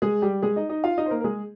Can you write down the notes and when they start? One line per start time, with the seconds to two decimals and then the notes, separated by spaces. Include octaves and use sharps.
0.02 G#3 G#4
0.22 G3 G4
0.43 G#3 G#4
0.56 D#4 D#5
0.69 D#4 D#5
0.84 F4 F5
0.98 D#4 D#5
1.06 C5
1.10 A#3 A#4
1.20 A#4
1.24 G#3 G#4